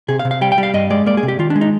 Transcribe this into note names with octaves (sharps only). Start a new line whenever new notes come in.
C3 G#4
F5
C3
F5
G3 G5
G5
G3
F5
G2 D#5
G#3 D5
A#3 D5
G#4
C3
G4
D#3 F4
D4
G#3
D#4